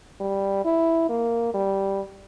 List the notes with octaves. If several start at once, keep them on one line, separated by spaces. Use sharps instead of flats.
G3
E4
A#3
G3